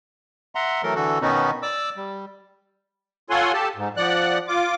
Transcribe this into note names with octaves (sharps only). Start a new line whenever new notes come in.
E5 F#5 A#5 C6
E3 F#3 A3 A4 A#4
D3 E3 F#4 A4
B2 D#3 B3 C#4 D#4 F#4
D5 D6 E6
G3
F4 A4 C#5 F#5 G#5 C6
G4 A4 A5
G#2
F3 D5 F#5 F#6
F4 D6